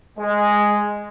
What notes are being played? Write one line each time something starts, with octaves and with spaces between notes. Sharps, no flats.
G#3